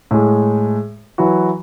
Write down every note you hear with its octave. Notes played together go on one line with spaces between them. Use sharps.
A2 G#3
E3 F#3 E4 F#4